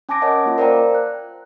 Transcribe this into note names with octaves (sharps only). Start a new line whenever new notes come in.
C#4 G#5 A5 D6 A#6 D7
A#4 C#5 D#5 F#5 A5
A#3 F4
A#4 C5 D5 F5 G5 A#5
F#6